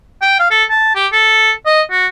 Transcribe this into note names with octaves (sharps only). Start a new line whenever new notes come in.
G5
F5
A4
A5
G4
A4
D#5
F#4